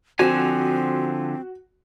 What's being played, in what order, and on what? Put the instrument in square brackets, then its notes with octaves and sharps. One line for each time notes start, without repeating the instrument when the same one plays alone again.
[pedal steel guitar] D3 F3 G#5 [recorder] C4 [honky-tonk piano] F#4